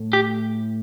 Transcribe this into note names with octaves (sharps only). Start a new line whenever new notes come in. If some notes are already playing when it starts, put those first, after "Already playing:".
Already playing: A2
G4